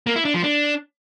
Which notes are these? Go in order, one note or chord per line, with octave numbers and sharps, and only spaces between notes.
A#3
E4
D4
F3
D4